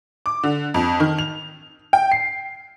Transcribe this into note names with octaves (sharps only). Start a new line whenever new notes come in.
D6
D3
F2
D#3
F7
G5
C7